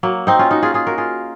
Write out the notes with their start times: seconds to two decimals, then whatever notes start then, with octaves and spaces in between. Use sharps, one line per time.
0.03 F#3 A#3
0.27 C4 D#4
0.39 C#4 F4
0.51 D#4 F#4
0.63 F4 G#4
0.74 F4 G#4
0.87 F#4 A#4
0.98 F4 G#4